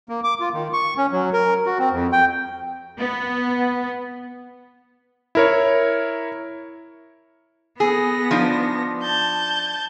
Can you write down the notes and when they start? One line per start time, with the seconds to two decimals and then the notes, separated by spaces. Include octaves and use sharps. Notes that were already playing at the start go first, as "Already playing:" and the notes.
0.09 A#3
0.24 D6
0.40 F4
0.53 D#3
0.73 C#6
0.97 C#4
1.12 F#3
1.33 A#4
1.66 F#4
1.79 C4
1.91 F2
2.12 G5
2.96 B3
5.35 E4 A#4 C#5
7.80 B3 G#4 A#6
8.31 F3 D4 D#4
9.02 A5 G6